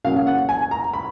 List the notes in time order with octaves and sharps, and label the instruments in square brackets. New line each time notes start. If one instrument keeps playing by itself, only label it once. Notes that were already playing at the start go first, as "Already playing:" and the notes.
[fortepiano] C#3 F#3 A#3 C#4 F5
F#5
G#5
A#5
B5